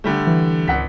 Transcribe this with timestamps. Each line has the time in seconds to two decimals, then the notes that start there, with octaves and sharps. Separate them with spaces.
0.04 D3 G3 A3
0.27 E3
0.68 G#1 C#2 F#5 B6